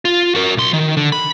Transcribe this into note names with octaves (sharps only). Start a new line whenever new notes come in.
F4
F#4 A#4
B1 C6
D#3
D3
B5